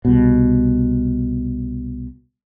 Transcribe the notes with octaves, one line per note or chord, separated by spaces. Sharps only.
C2 B2